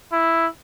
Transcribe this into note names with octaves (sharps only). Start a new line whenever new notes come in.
E4